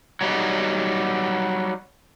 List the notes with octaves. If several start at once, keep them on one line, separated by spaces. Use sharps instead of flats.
F#3 G3 D#4